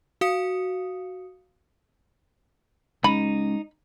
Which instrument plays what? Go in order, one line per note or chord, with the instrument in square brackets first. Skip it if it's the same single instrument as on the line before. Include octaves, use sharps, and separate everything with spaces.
[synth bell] F#4 F5 D#6 C#7
[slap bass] G#3 C#4 [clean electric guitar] D#4 [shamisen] B5